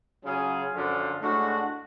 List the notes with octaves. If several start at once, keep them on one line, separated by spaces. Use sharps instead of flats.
C#3 F#3 C#4 F4 G#4
F#2 D3 F3
A2 G#3 D4 F#4